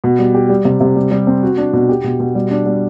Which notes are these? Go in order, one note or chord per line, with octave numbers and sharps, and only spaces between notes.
B2
G3
G4
G3
C3
C3
G3
G3
C4
F#4
D4
B2
G4
B2
B2
G3
D4
G3